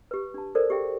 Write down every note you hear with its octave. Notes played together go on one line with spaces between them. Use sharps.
G4 B4
D4 A5
A4 A#4 C5 D5
G4 G#4 E5 G5